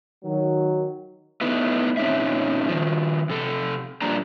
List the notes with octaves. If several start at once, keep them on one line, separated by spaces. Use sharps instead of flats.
D#3 F#3
A3 B3 D#4 E4 B4
A#2 C4 C#4 D#4 E5
D#3 F3
C3 A4
A#2 F3 G3 A#3 D4 A#5